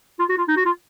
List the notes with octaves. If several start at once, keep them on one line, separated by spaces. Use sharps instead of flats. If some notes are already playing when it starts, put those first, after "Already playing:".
F4
F#4
F4
D#4
F#4
F4